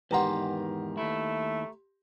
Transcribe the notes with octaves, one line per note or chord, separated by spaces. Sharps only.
E2 G#2 D#3 G4 B4 F#5 A#5 C6
D#2 A3 E4